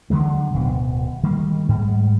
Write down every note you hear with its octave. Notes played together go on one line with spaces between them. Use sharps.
D3 E3 F#3 G#3
D1 B2
D#3 G3 G#3 A#3
G#2 G3 G#3